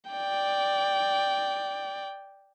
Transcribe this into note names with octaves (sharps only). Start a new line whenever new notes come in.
D5 G5